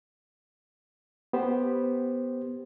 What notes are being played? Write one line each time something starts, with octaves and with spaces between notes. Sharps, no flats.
B3 G4 C5